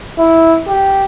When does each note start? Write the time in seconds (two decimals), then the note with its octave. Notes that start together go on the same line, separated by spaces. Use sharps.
0.19 E4
0.68 G4